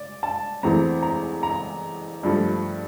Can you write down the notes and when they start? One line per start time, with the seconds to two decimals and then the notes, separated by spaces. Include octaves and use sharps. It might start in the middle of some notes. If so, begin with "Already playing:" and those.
Already playing: D5
0.23 A5
0.63 E2 E3 A3 C4 A#5
1.03 A#5
1.43 A#5
2.23 G2 F3 A3